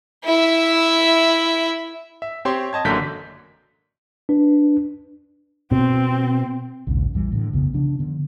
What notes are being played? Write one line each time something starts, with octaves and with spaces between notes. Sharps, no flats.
E4 E5
E5
C4 G4 C#5 C6
D#5 A5 G#6
A1 F#2 D3 A#3 G6 B6
D4 B4
B2 C4
A#1 D#2 G#2 C#3
A#1 E2 E3 G3
A2 D3
B1 F2 C#3 B3
C#3 F3 D4
D3 B3